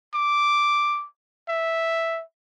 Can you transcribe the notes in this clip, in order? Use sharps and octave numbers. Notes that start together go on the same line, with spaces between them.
D6
E5